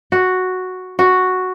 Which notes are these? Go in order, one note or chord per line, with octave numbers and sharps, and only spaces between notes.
F#4
F#4